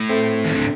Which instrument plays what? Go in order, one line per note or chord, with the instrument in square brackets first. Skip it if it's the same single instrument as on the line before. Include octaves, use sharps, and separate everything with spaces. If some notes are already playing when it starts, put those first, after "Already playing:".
Already playing: [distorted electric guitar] A2
[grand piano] A3 C4
[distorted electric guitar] D#3
D3